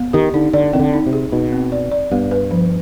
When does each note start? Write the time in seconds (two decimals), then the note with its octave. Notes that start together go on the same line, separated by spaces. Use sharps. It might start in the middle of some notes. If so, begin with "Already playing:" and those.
Already playing: B3
0.13 D#3 G4
0.34 D3 D#4
0.53 D3 D5
0.73 D#3 C4
0.79 D3
0.93 D#4
1.06 C3
1.13 G#4
1.32 B2 D#4
1.52 C4
1.72 D5
1.91 D5
2.12 G2 B3
2.31 B4
2.51 F3